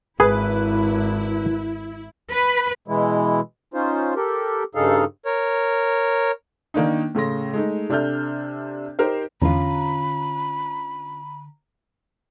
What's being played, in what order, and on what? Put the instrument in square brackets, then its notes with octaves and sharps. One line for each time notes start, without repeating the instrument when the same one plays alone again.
[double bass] G#1 [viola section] E4 [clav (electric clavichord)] G#4 [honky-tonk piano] B4
[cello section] B4
[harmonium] B2 E3 G#3 E4
C#4 D#4 F4 C5
G4 A4 A#4
G2 C#3 D#4 G#4 A4 F5
[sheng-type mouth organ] A#4 C#5
[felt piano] D#3 A#3 D4 D#4
A2 C#3 A4 C6 A#6
G#3 A3 D#4
C3 D4 A4 E5 F6 G6
D#4 G4 A#4 C5
[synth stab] E2 [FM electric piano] D3 A#5 [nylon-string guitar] C#4 F4 [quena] B5